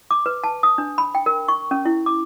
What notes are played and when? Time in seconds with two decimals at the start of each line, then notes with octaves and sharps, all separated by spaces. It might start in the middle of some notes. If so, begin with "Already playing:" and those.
0.11 D6
0.26 B4
0.44 A5
0.63 D#6
0.78 D4
0.98 B5
1.15 G5
1.26 A#4
1.48 C#6
1.71 C#4
1.85 E4
2.06 D6